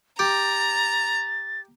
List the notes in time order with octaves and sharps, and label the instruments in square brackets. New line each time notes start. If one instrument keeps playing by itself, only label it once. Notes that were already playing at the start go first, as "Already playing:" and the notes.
[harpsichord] G4 [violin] A#5 [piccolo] A6